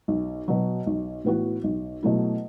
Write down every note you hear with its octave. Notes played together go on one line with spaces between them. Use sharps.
B1
B2 F#3
B1
A2 E3 B3 F#4
B1
B2 F#3 A3 E4